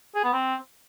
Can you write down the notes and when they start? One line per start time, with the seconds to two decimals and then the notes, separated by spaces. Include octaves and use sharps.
0.15 G#4
0.24 B3
0.33 C4